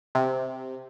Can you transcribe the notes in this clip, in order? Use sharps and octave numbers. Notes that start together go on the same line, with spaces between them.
C3